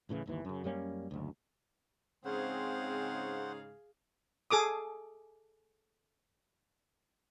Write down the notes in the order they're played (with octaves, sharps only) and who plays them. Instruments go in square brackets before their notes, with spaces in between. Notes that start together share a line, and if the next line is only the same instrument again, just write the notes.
[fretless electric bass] D1 A2 C#3 E3
G1 D#2 E3
F#2 C#3
F#2 G3 A#3 C#4
F#1 D2
[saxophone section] G#2 C#3 [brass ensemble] C4 [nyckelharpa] G#4 F5 [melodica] C5 F#5
[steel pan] G#4 A4 D6 D#6